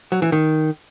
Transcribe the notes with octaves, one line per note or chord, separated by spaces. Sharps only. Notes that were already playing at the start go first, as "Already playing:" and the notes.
F#3
E3
D#3